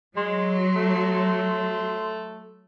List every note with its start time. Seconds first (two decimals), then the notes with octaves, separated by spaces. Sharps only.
0.17 F#3 G#3 C6
0.76 A3